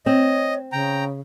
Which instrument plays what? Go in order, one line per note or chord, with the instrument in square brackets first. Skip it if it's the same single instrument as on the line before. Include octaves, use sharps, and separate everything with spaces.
[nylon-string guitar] C4 [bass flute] C#5 [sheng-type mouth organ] D#5
[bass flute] C#3 [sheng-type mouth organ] G5 A#5